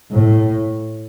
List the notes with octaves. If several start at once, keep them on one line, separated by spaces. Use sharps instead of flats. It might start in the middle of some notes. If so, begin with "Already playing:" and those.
A2